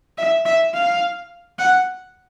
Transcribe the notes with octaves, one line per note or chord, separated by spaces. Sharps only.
E5
E5
F5
F#5